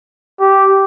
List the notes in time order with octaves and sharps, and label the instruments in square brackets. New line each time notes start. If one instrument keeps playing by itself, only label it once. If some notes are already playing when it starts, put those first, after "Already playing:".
[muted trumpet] G4